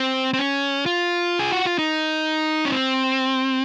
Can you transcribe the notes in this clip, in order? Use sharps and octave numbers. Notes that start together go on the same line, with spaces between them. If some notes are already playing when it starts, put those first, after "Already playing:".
Already playing: C4
C4
C#4
F4
G#4
F#4
F4
D#4
C#4
C4